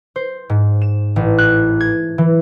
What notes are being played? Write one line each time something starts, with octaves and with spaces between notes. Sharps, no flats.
C5
G#2
E7
A1
F#6
G#6
E3